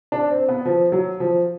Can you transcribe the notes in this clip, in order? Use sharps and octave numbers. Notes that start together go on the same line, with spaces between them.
D4
C4
B3
F3
F#3
F3